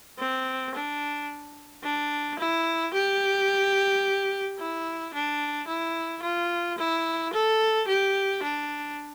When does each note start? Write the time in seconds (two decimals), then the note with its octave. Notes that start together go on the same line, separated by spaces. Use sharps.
0.19 C4
0.75 D4
1.83 D4
2.39 E4
2.94 G4
4.59 E4
5.14 D4
5.68 E4
6.23 F4
6.78 E4
7.33 A4
7.88 G4
8.43 D4